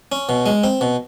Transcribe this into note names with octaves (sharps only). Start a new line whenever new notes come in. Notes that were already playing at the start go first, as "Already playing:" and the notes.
C#4
B2
G#3
C4
B2